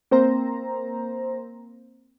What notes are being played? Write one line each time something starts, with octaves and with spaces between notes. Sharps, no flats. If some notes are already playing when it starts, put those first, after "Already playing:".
A#3 C4 C5 A#5